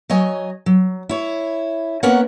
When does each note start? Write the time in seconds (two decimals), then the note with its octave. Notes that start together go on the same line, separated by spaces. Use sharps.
0.10 F#3 C#5 D#5 G#5
0.66 F#3
1.09 E4 C#5
2.03 A#3 B3 C#4 A#4 C#5 F#5